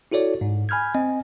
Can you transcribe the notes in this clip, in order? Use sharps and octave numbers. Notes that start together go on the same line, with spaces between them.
E4 F#4 A4 C#5 D5
G#2
G#5 B5 F6 G6 G#6
C4 D#5 G#5